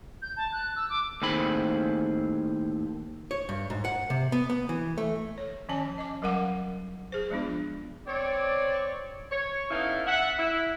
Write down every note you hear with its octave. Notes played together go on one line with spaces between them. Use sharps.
G6
A5
F#6
E6
D6
D#2 A2 C4 G#4 B5
C#5
G2
G#2
F#5
C3
B3
B3
E3
A3
C#5
D#3 F3 C#4 C#5 G#5 A5
D#5 D6
F#3 G3 A#4 F5 F#5 D6
G#4 C5
F3 G#3 B3 D4 F4
C4 C#5 D5
C#5
B3 C#4 D#4 E4 A4 F5
E5 F#5
E4